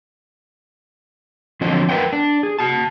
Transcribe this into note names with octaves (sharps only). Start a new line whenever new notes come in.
D3 F3 C4 F#4 C#5 D#5
A#4 B4 E5 F#5 G5
D4
G#4
F#4 A5